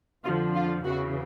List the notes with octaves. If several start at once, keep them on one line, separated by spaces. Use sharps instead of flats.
F2 D3 F3 F4
F4
E2 C#3 E3 F#4